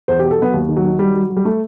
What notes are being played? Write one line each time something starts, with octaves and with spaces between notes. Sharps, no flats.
E2 C5
B2 G4
A4
F#3 B3
D#2
D#3
F#3
D#3
F#3 G3
F#3
F#3
G3
A3